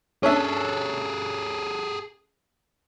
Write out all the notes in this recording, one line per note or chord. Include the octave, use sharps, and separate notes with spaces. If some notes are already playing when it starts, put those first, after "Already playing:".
C#4 D4 G#4 A4 E5